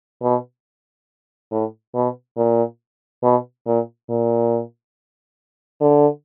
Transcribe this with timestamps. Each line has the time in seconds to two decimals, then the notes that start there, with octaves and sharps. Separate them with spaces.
0.23 B2
1.51 A2
1.95 B2
2.37 A#2
3.23 B2
3.67 A#2
4.09 A#2
5.81 D3